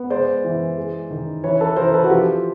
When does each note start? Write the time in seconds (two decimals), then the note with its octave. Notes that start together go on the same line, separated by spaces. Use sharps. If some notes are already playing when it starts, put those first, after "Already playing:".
Already playing: B3
0.10 G#3 C5 D5
0.44 E3
0.77 G#3
1.11 D#3
1.44 E3 B4 C#5
1.60 A4 B4
1.76 E3 A#4 C5
1.94 A4 B4
2.04 F#4
2.10 F3 F4 G4